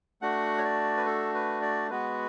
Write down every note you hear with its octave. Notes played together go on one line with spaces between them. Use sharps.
A3 D4 F#4 F#5
C#5
D5
B4
A4
B4
D5
G#3 B3 F#4 B4